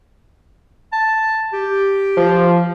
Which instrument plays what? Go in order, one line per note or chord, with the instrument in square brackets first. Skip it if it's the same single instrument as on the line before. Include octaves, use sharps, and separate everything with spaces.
[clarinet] A5
G4
[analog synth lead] F3